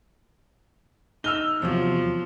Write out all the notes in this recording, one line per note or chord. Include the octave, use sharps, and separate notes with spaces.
D#4 E6 F6 G7
E2 C3 F3 F#3